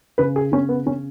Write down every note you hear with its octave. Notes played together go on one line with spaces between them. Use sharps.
C#3 B4
G#4
C#3 C#4
B3
C#3 C#4